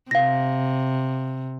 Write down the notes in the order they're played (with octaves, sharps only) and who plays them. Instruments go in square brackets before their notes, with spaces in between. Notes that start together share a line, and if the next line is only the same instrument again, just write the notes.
[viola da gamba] C3 [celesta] F5 A#6